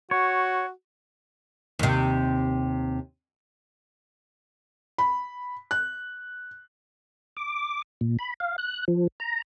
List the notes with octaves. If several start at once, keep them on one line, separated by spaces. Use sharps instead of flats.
F#4 C#5
D#2 C3
B5
F#6
D6
A#2
B5
F5
F#6
F3
A#5